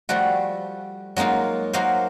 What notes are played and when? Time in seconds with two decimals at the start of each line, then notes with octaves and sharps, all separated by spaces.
0.09 F3 G3 A3 F#4
1.17 F#3 G#3 A#3 D#4 F4
1.73 F#3 A#3 D#4 A#4 C5